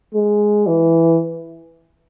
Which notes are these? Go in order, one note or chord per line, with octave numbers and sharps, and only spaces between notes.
G#3
E3